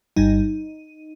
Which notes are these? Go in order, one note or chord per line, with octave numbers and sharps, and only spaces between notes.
G1 G2 G3 D#4